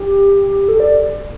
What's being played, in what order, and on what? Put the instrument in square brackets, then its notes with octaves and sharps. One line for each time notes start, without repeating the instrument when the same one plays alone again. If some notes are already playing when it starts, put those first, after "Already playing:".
Already playing: [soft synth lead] G4
A4
D5